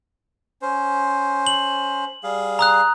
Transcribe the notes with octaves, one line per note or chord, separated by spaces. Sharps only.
C#4 C5
F#7
G3 G#4 F5
A#5 D#6 F#6